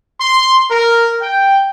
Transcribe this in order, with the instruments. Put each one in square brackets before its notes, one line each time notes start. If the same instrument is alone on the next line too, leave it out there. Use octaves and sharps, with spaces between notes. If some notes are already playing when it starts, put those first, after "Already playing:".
[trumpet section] C6
A#4
G5